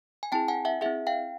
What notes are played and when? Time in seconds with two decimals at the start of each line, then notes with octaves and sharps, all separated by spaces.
0.23 G#5
0.32 C4 E4 G#4 G5 A5
0.48 F#5 G#5
0.65 E5 F#5
0.81 C4 E4 G#4 E5 F#5
1.07 F5 G5